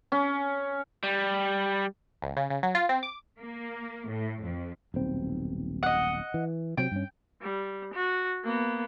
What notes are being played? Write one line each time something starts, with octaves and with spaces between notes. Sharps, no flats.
C#4
G3
C#2
C#3
C#3
F#3
F4
C4
D6
A#3
A2
F2
D#1 B1 C4
D#5 F#5
E3
C3 F#3 C4 G5
G2 C#4
G3
F#4
A#3 B3